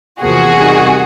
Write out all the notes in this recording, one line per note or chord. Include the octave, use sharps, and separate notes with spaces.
E2 C3 F3 A#3 F#4 G#4
C3 D#3 G3